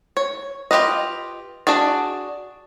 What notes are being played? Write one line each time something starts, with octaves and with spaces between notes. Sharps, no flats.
C#5
F4 G4 B4 D#5
D4 F#4 G#4 D5